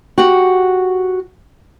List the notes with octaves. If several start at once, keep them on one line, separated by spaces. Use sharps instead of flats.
F#4 G4 F#5